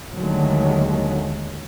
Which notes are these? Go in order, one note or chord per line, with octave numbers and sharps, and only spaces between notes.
D#2 D3 D#3 F#3 G#3 A3